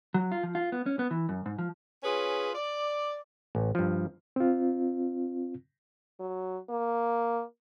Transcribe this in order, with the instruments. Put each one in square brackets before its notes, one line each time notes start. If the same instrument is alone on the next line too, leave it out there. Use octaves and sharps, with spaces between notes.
[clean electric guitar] F#3
F4
F3
F4
B3
C#4
B3
E3
F#2
G#2
F3
[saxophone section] C#4 F4 G#4 B4
D5
[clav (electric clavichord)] A1
G2 F3
[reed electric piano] C4 F4
[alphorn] F#3
A#3